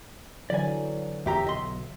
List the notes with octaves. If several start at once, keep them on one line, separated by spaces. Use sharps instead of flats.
D3 E3 F#3 D5 G#5
E2 G4 E5 A#5
B1 D#5 C6